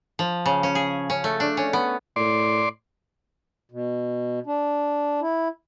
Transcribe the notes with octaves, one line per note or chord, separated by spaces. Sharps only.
F3
C#3
C#4
G#4
C#4
A3
D4
C#4
B3
A2 D5 C6
B2
D4
E4